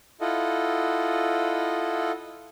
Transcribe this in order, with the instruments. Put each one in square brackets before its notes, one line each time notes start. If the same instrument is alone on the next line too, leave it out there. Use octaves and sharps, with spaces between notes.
[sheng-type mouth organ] E4 F4 A4 D#5 F#5